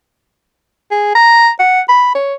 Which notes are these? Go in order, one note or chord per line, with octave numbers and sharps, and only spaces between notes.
G#4
A#5
F#5
B5
C#5